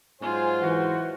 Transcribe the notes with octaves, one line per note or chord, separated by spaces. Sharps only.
G#2 F#3 F4 C5 G#5
E3 F#4